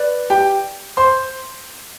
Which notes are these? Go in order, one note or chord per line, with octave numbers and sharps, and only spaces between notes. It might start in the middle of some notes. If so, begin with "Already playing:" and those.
Already playing: B4 D5
G4 G5
C5 C6